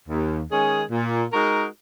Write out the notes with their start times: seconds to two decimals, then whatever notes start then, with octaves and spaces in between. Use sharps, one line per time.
0.08 D#2
0.50 D#3 G#3 C#4 G#4
0.91 A#2
1.33 G#3 D#4 F#4 A#4